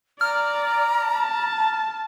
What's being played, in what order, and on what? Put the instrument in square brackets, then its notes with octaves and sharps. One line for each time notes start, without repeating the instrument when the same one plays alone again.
[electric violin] D5 [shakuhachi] A#5 [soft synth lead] F6
[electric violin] A5